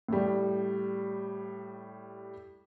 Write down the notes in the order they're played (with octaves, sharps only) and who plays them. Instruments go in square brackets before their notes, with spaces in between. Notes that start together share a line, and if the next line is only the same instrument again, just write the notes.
[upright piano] A2 G3